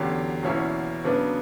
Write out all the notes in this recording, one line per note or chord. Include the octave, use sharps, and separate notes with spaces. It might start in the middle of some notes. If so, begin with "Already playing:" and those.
Already playing: E2 D3 F#3 C#4 G4
E2 B2 A#3 C#4 E4
C#3 F#3 B3 D4